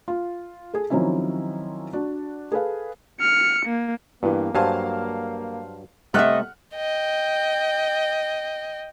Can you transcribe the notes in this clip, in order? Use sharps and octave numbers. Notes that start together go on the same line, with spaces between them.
F4
G#4 A4
D#3 F3 F#3 C4 C#4 E4
D4 F#4
G#4 A4 B4 F5
F6 C#7
A#3
G2 E3 A#3 B3
G2 F#3 C5 F5 G#5 A5
C3 A3 D#5 E5 F#5 F6 F#6
D#5 G5